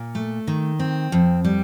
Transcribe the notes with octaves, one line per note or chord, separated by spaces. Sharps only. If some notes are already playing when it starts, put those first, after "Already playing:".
Already playing: A#2
A3
D#3
C4
F2
G3